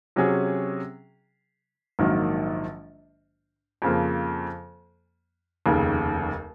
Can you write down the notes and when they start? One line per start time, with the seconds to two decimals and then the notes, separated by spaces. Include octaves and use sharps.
0.16 C3 F#3 C#4 G#4
1.99 A#1 G#2 D#3 F#3 A#3
3.82 F2 C#3 F3 A#3
5.66 F1 D#2 C#3